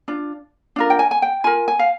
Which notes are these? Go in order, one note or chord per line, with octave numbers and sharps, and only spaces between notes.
D4 F4
D4 F4 A#4
G5
G#5
G#5
G5
F4 A#4 G#5
G#5
F5